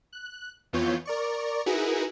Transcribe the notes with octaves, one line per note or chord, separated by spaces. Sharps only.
F#6
F2 E3 B3 F4 C#5 G6
A#4 D5 C#6
D#4 E4 F#4 G#4 A#4 B4